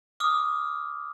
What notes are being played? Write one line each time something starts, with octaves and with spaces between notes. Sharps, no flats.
D6 D#6 F6